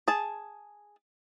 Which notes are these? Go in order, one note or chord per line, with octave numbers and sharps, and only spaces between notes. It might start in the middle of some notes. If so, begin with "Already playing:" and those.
G#4 A5